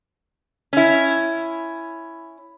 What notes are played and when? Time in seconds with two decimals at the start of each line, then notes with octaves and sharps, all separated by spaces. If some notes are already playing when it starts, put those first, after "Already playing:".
0.73 C#4 E4